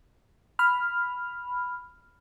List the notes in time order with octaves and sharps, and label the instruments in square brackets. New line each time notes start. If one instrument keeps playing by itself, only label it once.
[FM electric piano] B5 F6